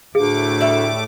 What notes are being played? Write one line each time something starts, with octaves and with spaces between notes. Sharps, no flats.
D2 A2 A3 G#4 D6
G3 E5